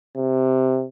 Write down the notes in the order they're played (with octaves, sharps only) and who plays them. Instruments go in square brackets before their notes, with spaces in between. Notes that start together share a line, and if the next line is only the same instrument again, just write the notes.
[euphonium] C3